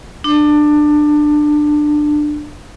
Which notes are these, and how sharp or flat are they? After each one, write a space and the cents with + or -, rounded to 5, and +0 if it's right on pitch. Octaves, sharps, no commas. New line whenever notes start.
D4 +20